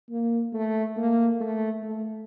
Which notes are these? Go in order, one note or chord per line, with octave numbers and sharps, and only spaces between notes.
A#3
A3
A#3
A3
A3